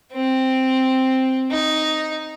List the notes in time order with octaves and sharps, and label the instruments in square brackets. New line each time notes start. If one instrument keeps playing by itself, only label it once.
[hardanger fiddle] C4
D#4